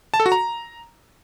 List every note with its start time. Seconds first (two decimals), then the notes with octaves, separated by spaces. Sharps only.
0.14 A5
0.20 A4
0.26 F#4
0.32 A#5